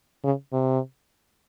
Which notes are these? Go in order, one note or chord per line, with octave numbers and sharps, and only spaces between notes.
C#3
C3